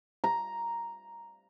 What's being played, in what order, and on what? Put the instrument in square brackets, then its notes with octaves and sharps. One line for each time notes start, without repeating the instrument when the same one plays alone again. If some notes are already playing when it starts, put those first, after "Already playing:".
[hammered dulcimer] A#5